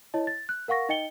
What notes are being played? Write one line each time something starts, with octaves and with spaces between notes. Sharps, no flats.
E4 C#5 D#5 A5
A6
F#6
A#4 F5 F#5 C#6 A#6
D#4 D#5 G5 C#7 G7